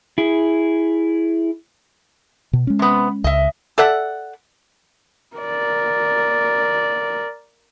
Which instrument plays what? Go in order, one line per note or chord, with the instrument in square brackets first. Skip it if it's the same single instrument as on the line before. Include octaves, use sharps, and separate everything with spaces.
[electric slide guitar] E4 G#4
[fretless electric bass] B2
G#3 C#4
[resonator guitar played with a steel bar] C3 B3
[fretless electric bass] C#2 [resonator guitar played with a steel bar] D#5 E5
[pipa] A4 D5 E5 F#5
[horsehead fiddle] A#4 D5